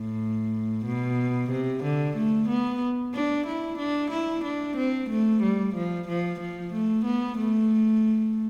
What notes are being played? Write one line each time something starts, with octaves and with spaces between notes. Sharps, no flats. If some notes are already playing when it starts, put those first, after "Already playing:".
Already playing: A2
B2
C3
D3
A3
B3
D4
E4
D4
E4
D4
C4
A3
G3
F3
F3
F3
A3
B3
A3